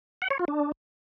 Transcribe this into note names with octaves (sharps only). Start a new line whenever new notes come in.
F#5
C#5
F4
D4